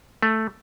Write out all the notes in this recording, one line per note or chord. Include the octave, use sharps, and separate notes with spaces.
A3